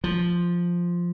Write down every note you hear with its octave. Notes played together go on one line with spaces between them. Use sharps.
F3